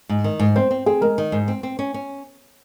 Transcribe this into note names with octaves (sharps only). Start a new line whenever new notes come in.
G#2
D#3
G#2
C4 C5
C4
C4 G#4
G#3 A#4
D#3
G#2
C4
C4
C#4
C#4